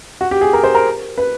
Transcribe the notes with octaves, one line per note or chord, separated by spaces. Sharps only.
F#4
G4
G#4
A#4
C5
A#4
B4